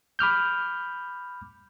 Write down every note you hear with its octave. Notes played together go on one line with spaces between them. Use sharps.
B5 D6 F6 G6